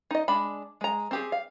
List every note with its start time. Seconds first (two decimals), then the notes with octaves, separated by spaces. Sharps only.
0.11 D#4 D#5
0.28 G#3 D4 B5
0.81 G#3 A#5
1.11 C4 G4 G#4
1.32 F5